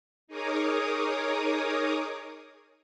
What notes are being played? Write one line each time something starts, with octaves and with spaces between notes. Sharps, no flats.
D#4 G#4 A#4 C#5 D6 D#6